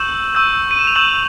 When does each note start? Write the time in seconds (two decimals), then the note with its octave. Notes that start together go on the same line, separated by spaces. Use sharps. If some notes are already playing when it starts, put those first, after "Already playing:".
Already playing: C#6 E6 G6 E7 F#7
0.35 C#6 E6 G6
0.71 D#7
0.79 E7
0.87 F7
0.95 C#6 E6 G6 E7 F#7